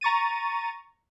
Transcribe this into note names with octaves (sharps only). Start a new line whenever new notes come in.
A#5 C#6 A6 D#7